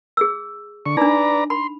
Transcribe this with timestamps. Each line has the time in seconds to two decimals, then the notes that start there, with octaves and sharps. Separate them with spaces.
0.17 G#4 E6
0.86 D3 C#6
0.97 D4 D#4 B4 D5 A#5
1.50 B5 C6